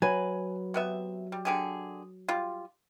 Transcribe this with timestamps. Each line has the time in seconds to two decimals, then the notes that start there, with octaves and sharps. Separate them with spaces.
0.02 F#3 B4 G#5
0.74 C3 B3 E5
1.32 G3
1.45 D3 G4 G#4
2.28 G3 F4